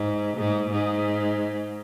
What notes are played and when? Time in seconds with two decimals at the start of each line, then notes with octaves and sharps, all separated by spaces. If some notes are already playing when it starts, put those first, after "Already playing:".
Already playing: G#2
0.37 G#2
0.70 G#2